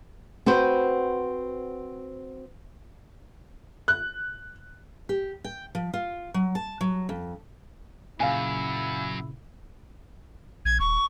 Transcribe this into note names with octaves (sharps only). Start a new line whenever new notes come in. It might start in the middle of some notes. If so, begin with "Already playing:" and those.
C4 F#4 B4 C5
F#6
G4
G5
F3
F4
F#3
A5
F#3
F2
F#2 A#2 C#3 E4 F5 G#5
A#1 G#6
D#1 C#6